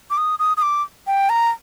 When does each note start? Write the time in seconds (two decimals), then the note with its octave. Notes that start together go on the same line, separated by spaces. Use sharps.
0.10 D6
0.18 D#6
0.39 D#6
0.57 D#6
0.62 D6
1.07 G5
1.29 A#5